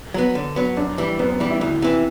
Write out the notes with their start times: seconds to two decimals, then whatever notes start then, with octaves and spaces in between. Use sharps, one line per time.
0.14 F#3 B3
0.35 D3
0.56 F#3 B3
0.76 F#2 D4
0.98 E3 G3
1.19 F#2 B3
1.30 B3
1.40 E3 G3
1.50 E4
1.61 D2 E4
1.82 C3 E3